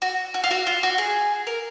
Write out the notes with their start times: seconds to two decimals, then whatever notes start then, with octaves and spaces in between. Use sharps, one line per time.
0.02 F#4
0.34 F#4
0.44 F4
0.51 F#4
0.67 F4
0.83 F#4
0.98 G#4
1.47 A#4